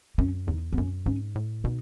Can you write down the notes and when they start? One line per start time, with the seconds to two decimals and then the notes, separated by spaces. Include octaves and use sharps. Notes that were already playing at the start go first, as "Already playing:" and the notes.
0.18 F#2 C#4
0.47 E2 D#4
0.73 B3
0.78 F#2 C#4
1.06 G#2 C#4
1.36 A2
1.64 B2 D#4